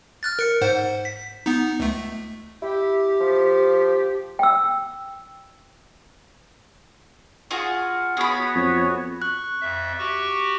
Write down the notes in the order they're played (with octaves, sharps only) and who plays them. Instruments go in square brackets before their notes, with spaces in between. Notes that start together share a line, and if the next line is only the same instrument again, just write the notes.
[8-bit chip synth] F6 F#6 A6
A#4 C#7
G#2 C5 F#5
B6
B3 D#4
C#2 A3
[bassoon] E4 [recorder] G4
[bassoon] F3
[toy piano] G5 E6
[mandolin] F4 F#4 G#4
[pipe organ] B3 F#4 C#5 [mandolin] G#4 B5
[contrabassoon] F2
[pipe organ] C#6 [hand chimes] F#6
[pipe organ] F2 E5
F#4 G4 C#6